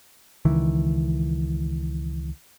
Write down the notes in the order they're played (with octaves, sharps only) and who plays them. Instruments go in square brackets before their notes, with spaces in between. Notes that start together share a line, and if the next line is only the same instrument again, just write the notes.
[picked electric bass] C#2 D#3 E3